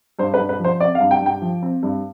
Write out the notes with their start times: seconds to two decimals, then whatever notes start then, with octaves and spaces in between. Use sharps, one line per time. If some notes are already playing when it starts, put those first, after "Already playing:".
0.19 G2 C5
0.34 B4
0.39 G2
0.49 B4
0.60 F3 C5
0.80 C4 D5
0.95 F5
1.00 G2
1.11 G5
1.21 G2
1.26 G5
1.42 F3
1.62 C4
1.83 G2